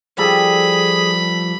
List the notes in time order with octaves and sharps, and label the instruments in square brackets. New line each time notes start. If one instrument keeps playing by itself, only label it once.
[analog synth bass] F3 [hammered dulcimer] G3 A4 [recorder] G#4 [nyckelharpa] B5